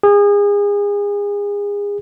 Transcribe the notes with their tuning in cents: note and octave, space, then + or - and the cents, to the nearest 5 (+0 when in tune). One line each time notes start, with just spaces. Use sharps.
G#4 -30